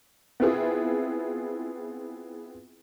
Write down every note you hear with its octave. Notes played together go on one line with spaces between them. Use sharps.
B3 C4 E4 F4 G#4